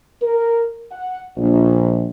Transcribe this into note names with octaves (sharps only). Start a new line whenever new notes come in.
A#4
F#5
A#1